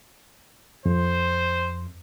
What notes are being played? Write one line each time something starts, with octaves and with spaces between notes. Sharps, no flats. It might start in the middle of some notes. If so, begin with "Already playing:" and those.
F2 C5